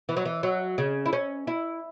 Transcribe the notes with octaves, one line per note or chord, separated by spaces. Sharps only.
E3
F#3
E3
F#3
C#3
E4
C#4
E4